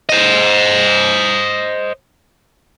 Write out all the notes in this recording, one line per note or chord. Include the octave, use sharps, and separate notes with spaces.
C5 D#5